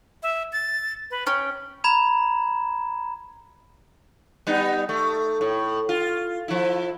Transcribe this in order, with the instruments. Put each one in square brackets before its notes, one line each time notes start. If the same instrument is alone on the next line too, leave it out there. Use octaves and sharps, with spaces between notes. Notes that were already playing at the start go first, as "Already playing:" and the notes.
[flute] E5
A6
B4
[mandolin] C#4 [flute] G5
[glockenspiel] A#5 B5 G#6 E7
[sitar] G3 B3 D#4
A3
A2
F4
F3 E4